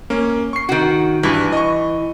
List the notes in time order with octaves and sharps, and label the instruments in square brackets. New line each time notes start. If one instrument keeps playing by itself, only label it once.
[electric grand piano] A#3 C#4
C#6 C7
[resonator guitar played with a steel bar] D#3 F#4
[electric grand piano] G2 [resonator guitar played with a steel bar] E3
[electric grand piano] D#5 C#6